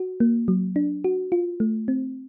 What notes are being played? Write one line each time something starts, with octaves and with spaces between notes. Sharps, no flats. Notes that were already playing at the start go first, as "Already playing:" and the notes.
Already playing: F#4
A#3
F#3
D4
F#4
F4
A3
C4